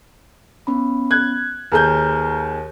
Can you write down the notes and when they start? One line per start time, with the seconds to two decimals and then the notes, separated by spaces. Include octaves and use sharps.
0.67 B3 C#4 B5
1.11 F#6 G#6
1.72 D#2 G#4 B4 A#5 F6 G6